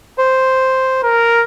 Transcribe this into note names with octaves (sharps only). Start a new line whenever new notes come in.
C5
A#4